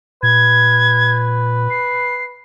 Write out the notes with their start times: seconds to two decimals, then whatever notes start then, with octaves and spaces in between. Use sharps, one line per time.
0.23 A#2 B4 G#6
1.70 C7